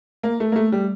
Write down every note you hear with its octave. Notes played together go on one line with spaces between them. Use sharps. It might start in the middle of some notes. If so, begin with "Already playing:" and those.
A#3
A3
A#3
A3
G3